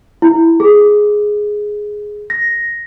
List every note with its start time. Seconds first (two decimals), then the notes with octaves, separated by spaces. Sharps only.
0.22 E4
0.60 G#4
2.30 A#6